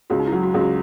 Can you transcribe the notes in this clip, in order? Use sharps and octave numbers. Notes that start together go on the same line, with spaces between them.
C#2 F#4
D#4
E4
F#3
F#4
C#2
F#4